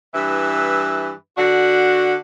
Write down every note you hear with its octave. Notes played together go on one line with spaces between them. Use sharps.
G2 E3 E4 B4 E5
D3 D4 F#4